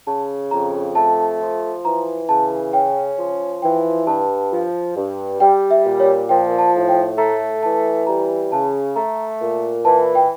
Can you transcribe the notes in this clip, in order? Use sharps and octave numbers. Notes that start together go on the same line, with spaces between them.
C#3 A5
F2 A#5
A3 A5
F3
E3 A#5
C#3 A5
C#4 G5
F3
E3 G5
G2 A5
F3
G2
G3 G5
E5
A#2
C#5
F3 G5
A5
A2
G5
A3 A#5
E3 A5
G3 A#5
C#3 A5
A3 A#5
A#2
E3 A5
G5